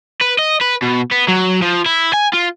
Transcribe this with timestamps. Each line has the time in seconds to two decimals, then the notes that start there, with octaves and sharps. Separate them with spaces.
0.21 B4
0.39 D#5
0.61 B4
0.82 B2
1.11 B3
1.28 F#3
1.62 F3
1.86 E4
2.13 G#5
2.34 F4